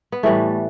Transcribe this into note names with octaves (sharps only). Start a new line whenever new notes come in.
B3
A2 E3 G3 A3